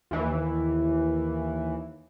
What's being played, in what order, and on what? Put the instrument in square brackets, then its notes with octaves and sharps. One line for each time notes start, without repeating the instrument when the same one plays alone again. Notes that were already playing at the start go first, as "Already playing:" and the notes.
[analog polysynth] D#2 E3